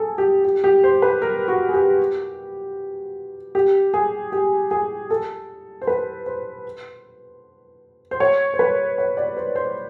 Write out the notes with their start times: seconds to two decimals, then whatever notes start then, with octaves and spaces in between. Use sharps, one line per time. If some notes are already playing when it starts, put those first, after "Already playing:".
Already playing: G#4 A4
0.18 G4
0.45 G4
0.64 G4
0.84 C5
1.02 B4
1.22 A#4
1.48 F#4
1.69 G#4
1.74 G4
3.55 G4
3.94 G#4
4.32 G4
4.71 G#4
5.10 A4
5.82 C5
5.87 B4
6.26 C5
8.11 C5
8.20 C#5
8.54 C5
8.59 B4
8.98 C#5
9.17 D5
9.37 C5
9.56 C5